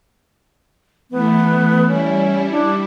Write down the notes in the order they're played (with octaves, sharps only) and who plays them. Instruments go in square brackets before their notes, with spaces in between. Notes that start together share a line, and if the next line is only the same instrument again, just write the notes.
[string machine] E3 A3 [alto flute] B3
[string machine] G3 E4 [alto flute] C#4
[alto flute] D4